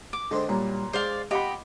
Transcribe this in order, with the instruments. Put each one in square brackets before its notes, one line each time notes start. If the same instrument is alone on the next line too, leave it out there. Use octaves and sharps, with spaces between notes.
[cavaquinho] D6
[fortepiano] D3 C6 [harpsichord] G#3 C4 D4
[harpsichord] G2 G3 [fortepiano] A#2 F#3
[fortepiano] G#3 [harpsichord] D4 [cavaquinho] C5 D5 F5
[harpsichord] F4 [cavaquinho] G4 [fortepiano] D#5 F#5 B5